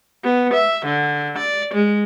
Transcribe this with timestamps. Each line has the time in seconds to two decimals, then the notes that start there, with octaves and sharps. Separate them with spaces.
0.24 B3
0.54 E5
0.86 D3
1.38 D5
1.74 G#3